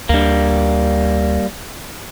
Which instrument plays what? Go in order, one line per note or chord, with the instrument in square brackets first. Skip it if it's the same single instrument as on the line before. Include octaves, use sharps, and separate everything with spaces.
[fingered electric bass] D2 D4 [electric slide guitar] G3 A#3